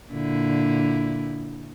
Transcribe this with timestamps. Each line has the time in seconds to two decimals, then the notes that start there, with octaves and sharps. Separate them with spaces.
0.11 A#2 D3 E4